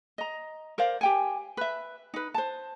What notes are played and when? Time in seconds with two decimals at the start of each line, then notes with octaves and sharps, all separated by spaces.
0.18 D#5 A#5
0.78 A#4 C5 D5 F5
1.01 G4 G5 G#5
1.57 B4 E5
2.14 D#4 B4
2.34 C5 A5